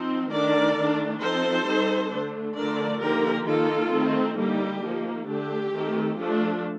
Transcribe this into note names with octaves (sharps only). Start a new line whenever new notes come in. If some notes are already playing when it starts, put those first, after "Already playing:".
Already playing: F3 C4 D#4
D#3 A3 D4 A#4 D5
D#3 A3 D4
F3 C4 D#4 A4 C5
G3 C4 D#4
D3 A3 D4
D3 F3 A3 D4 A#4 D5
D3 F3 A#3 D#4 G4 A#4
D#3 A#3 D#4 F4 A4
D#3 A3 C4 D#4
D3 G3 A#3 D#4 G4
F3 A#3 D#4
D3 A3 D4 G4
D#3 A3 C4
F3 A3 D4